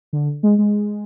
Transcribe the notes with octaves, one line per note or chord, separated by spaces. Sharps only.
D3
G#3
G#3